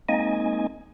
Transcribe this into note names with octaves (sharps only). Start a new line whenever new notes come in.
G#3 A#3 C4 D#4 D#5 G#5